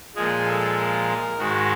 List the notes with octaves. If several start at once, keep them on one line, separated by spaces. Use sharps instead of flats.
A#2 F3 G#3 G#4
A4
A#4
G#2 D#3 G#3 F#4